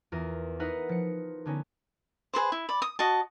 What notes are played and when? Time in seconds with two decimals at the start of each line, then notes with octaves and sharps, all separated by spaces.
0.12 E2 F4 A#4 D#6 A#6
0.59 D#4 E4 A#4 B4 F#5 D#6
0.89 F3 C#7
1.45 D3 B3 C#4 D#4
2.34 G#4 A4 B4 C5
2.52 E4
2.69 D5 B5
2.82 D#6
2.99 F#4 D#5 A5